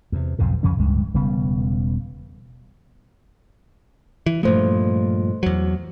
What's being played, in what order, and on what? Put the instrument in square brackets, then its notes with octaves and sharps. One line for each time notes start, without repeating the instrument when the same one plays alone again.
[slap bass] E2 C3
B1 F2 G#2 C#3
F2 C#3 F3 C#4
D1 C#2 G2 G#3
E1 C#3 G3 B3
[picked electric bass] E3
[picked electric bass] G2 A#2 F3 [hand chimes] A3 C5
[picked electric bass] E2 F#3